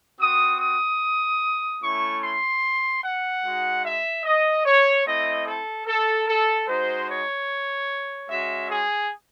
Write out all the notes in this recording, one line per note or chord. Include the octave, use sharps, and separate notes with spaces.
C4 F#4 D#6
D#6
A3 C#4 E4 C#6
C6
F#5
G#3 D#4 F#4
E5
D#5
C#5
A3 C4 E4 D#5
A4
A4
A4
G#3 D#4 F#4 C5
C#5
G#3 C#4 F#4 E5
G#4